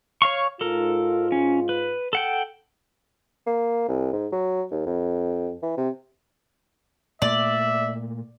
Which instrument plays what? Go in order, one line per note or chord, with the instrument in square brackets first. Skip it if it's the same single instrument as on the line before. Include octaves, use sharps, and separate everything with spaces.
[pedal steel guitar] C#5 F5 C#6
[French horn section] G#2 F4 [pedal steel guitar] A4 A#4
[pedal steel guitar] C#4
B4
A4 F#5 G5
[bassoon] A#3
C2
G#2
F#3
D#2
F2
E3
C3
[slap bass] A#2 A3 [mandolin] D5 [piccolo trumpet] E5